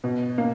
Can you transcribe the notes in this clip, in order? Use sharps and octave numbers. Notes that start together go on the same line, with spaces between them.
B2
A#3